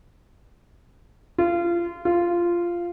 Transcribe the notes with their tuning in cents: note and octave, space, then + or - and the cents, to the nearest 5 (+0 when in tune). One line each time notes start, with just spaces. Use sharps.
F4 -25
F4 -10